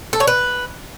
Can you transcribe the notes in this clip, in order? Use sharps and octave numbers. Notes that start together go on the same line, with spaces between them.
A4
C#5
B4